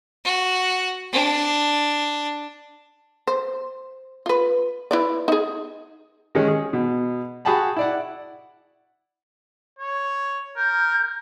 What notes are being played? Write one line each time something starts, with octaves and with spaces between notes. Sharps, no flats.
F#4
D4
C5
F4 B4
E4 B4 D5
D#4 G#4
D#3 G#3 C#4
G#4
B2
F#4 G#4 F#5 G5 A5 B5
E4 D5 F#5
C#5
A#4 G6